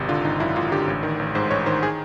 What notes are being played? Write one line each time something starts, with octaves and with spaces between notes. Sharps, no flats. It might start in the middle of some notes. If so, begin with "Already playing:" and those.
Already playing: G#1 C3
D3 F4
G#1 D#4
F#2 E4
G#1 F4
D3 G4
A1
D#3
A1
G#2 C5
A1 C#5
D#3 C5
G#4